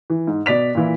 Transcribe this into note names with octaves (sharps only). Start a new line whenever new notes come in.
E3
G#2
B2 D5 B6 F7
A#2 E3 E4